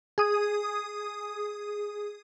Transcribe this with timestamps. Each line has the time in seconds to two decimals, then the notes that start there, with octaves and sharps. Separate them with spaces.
0.18 G#4 D#6